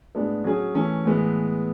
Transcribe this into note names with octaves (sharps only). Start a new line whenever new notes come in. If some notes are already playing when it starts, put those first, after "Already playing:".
A2 G#3 B3 D4
F#3 C#4 G#4
E3 A3 C#4
A2 E3 G#3 B3